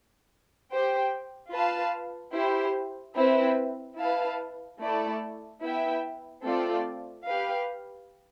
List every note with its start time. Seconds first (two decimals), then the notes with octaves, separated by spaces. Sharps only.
0.69 G4 C5 G5
1.51 F4 B4 F5 A5
2.33 E4 G4 C5
3.16 C4 E4 B4 E5
3.97 E4 B4 F5 A5
4.80 A3 E4 A4 D5
5.62 B3 E4 B4 E5 G5
6.44 A3 C4 F4 A4 D5
7.26 G4 B4 F5